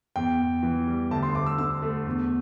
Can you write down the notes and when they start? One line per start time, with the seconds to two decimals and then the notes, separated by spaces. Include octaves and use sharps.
0.16 E2 G5
0.39 E2
0.63 E3
0.87 G3
1.11 D2 A5
1.23 C6
1.35 D2 D6
1.46 E6
1.58 D3 E6
1.82 A3
2.06 E2